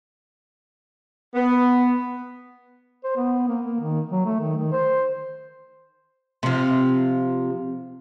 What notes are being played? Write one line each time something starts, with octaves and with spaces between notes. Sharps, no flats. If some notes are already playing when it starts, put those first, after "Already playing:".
B3
C5
B3
A#3
A#3
D#3
F#3
A3
D#3
D#3
C5
C3 F3